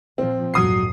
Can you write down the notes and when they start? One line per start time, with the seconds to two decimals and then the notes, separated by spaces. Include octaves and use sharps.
0.18 A#2 F3 C4
0.54 A#1 F2 G#2 F#3 D#6 C7